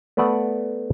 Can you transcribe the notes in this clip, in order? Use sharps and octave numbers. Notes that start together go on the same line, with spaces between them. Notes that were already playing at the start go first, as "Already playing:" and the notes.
A3 B3 B4 D5 F#5